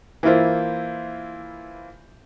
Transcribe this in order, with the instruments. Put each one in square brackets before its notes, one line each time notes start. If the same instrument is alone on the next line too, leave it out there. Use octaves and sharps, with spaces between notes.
[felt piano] E3 A#3 E4 F4 C5